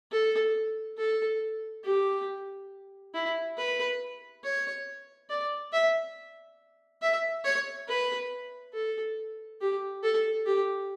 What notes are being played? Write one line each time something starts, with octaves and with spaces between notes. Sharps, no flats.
A4
A4
G4
E4
B4
C#5
D5
E5
E5
C#5
B4
A4
G4
A4
G4